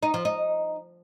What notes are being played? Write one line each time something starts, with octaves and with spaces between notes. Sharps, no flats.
D#4
F3
D#4